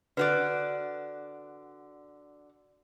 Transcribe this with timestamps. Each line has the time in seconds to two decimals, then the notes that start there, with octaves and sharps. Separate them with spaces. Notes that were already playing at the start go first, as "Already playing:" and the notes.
0.17 D3 F#4 B4 D5